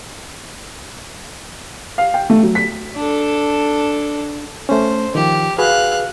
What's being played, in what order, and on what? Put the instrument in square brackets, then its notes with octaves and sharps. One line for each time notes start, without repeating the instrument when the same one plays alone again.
[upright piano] F5
G5
A3
F#3
B6
[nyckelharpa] D4 A4
[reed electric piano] A3 C#4 [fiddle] C5
[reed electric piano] D#3 F3 [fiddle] G4
[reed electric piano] F#4 G#4 B4 [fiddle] F5 F#6